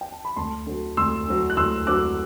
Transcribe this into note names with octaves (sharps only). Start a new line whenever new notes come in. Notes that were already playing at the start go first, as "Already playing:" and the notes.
G5
A5
B5
D2 A5 C6
D3 F#3
D2 C6 E6
D3 F#3
F#6
D2 C6 E6
D3 F#3 D6 F#6